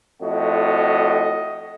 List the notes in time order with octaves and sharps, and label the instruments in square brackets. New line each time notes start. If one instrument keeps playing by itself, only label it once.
[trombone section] F2 A2 F#4 [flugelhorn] D#5